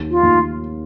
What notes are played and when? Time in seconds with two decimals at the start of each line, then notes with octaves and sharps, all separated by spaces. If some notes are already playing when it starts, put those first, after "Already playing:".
Already playing: D#2
0.11 F4
0.23 D#2